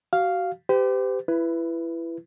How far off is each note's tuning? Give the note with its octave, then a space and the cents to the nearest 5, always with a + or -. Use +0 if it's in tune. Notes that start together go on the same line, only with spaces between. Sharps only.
F#4 +30 F5 +0
G4 +0 C5 -45
E4 +20 B4 +0